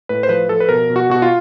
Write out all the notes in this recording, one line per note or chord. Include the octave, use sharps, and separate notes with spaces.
A2 B4
C5
F3 B4
F3 A4
B4
B2 A#4
B2
F#4
B2 F#4
F4